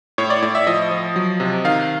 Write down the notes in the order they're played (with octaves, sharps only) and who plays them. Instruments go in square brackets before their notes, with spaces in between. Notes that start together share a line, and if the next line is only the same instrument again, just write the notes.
[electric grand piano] A2 C#5
D5
A2 D5
E5
F3 D#5
F3
F#3
C3
D#3 F5